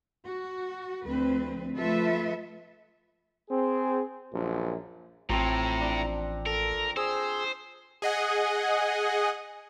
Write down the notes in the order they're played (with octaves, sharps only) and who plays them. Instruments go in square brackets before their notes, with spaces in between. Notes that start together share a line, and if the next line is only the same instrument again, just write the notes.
[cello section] F#4
D2 F3 C4 B4
F3 A3 F4 A4 B4 E5
[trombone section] C4 G#4
A#1 F#2
[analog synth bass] A1 [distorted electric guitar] A2 [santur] F3 C4 C6 [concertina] A#5
[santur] D4
[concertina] A4 [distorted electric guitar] A#4
[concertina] G#4 E6 [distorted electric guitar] C5
[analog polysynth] G#4 D#5 F#5 G#5